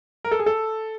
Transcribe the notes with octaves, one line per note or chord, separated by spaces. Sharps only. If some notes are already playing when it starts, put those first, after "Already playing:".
A#4
A4
G#4
A4